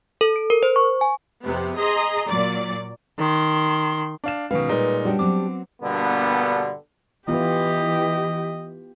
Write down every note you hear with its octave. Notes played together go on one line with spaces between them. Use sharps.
A4
D7
A#4
C5
C#6
G#5
F2 C3 B3
G#4 D#5 A#5 C6
A#2 F#3 D5
D#3 C6
D4 F5 E7
B2 D#3 G#3 C#4 B4 F5
A#2 G3 G#3 D#4
G3 D4 F#4 G4 C#5
F#3 B3 C4 D6
G2 B2 D3 G3 A#3 B3
E3 B3 F4 G4 D#5